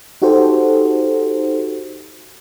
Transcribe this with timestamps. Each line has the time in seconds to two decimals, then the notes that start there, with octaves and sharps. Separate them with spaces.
0.22 D#4 F#4 G4 A4 C5